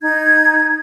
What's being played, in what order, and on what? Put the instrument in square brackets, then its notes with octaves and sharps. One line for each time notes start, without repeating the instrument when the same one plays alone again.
[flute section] D#4 G#6